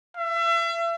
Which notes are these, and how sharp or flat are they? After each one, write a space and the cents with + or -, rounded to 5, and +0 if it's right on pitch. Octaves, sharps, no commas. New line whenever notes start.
E5 +35